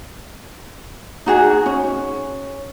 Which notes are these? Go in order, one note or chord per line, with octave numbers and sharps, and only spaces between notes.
D#4 F#4 G#4
C#4